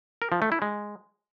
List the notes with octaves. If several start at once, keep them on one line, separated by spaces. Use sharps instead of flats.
A#4
F3
A3
E4
G#3